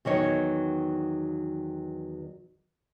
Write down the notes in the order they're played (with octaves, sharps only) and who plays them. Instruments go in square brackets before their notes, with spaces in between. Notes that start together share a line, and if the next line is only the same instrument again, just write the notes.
[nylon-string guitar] E2 D#3 F#3 C#5